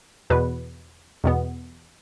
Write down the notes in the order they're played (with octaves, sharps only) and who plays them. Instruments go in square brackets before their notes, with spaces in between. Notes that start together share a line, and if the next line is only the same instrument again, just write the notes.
[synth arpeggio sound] E2 B2 B3 B4
E2 B2 B3